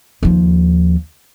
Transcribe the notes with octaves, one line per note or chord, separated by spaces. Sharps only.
D#2 F3